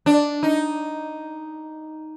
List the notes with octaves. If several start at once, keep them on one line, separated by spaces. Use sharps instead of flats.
D4
D#4